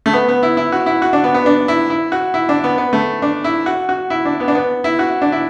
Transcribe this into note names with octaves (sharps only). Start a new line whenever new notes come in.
A3
B3
B3
E4
E4
F#4
E4
F#4
D4
B3
B3
D4
E4
E4
F#4
E4
D4
B3
B3
A3
D4
E4
F#4
F#4
E4
D4
B3
D4
B3
E4
F#4
D4
E4